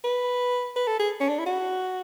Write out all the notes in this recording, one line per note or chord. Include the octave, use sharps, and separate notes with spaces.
B4
B4
A4
G#4
C#4
D4
E4
F#4